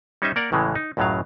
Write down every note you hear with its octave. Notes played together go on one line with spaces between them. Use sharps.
G3 C#4 D#4 C5 D#5 E5
A#3 A#4 D5 F#5
A1 A2 C#3 E3 G#3
D#4
C#2 F#2 A2 C#3 F#3 F5